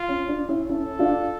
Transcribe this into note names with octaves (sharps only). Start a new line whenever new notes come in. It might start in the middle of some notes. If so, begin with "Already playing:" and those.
Already playing: F4
C#4
D4
C#4 E4
C#4 E4 A4
D4 F4